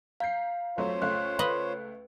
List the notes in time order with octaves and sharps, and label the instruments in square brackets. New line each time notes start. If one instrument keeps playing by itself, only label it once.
[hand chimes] F5 [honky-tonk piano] A#5 G6 C7
[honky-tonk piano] F2 F#3 A3 [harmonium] F4 C5 C#5
[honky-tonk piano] C#2 A3 F5 [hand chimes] F#6
[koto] B4 D#5